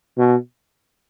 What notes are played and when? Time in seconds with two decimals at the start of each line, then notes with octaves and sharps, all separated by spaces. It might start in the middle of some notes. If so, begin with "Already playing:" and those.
0.18 B2